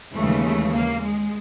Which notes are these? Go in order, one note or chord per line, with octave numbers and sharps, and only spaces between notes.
D#2 C#3 E3 G#3 A3
A3
A#3
G#3